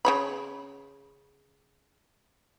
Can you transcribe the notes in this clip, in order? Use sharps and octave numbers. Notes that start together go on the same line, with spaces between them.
C#3 C#5 B5